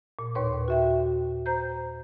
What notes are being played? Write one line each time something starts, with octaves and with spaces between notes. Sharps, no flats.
A#2
D#2 A2 B4 C#5 C6
F#4 E5 G5
C5 A#5 G6